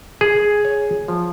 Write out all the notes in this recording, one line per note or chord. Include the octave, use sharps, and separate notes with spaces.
G#4
C#5
F3